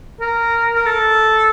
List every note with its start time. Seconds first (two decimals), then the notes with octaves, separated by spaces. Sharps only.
0.21 A#4
0.75 A#4
0.86 A4